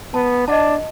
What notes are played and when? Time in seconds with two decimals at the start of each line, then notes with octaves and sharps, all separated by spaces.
0.14 B3 A5
0.48 D4 D#5 F#5 A5